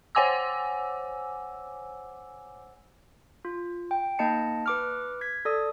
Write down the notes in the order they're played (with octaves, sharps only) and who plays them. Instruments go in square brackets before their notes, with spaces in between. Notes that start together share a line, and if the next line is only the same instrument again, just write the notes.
[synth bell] C5 C#5 F#5 G#5 D6 E6
[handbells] F4
G5
A#3 D#4 D#5 A5 C#7
B4 D6 F6
G#6 B6
A4 D5 D#6